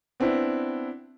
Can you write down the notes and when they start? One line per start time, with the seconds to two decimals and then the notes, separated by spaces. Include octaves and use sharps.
0.20 B3 C4 D4 E4